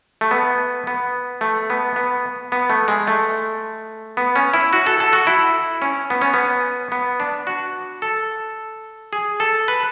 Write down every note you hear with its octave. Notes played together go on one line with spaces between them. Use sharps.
A3
B3
B3
A3
B3
B3
B3
A3
G#3
A3
B3
C#4
E4
F#4
A4
A4
F#4
E4
C#4
B3
C#4
B3
B3
D4
F#4
A4
G#4
A4
B4